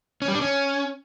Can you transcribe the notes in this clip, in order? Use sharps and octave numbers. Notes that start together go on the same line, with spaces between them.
C#4
G3
D4
C#4